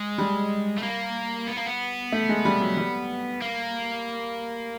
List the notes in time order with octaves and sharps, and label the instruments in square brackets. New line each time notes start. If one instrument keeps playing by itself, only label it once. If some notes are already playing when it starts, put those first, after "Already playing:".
Already playing: [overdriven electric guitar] G#3
[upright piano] G3
[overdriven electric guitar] A3
A#3
B3
A#3
B3
[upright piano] A3
G#3
G3
F#3
G3
[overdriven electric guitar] A#3